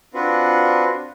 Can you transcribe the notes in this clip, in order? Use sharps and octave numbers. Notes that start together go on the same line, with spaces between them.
C4 D4 F4 F#4 B4